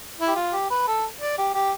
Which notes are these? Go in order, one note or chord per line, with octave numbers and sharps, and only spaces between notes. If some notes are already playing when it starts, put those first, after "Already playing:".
E4
G4
F4
G4
B4
A4
D5
G4
G4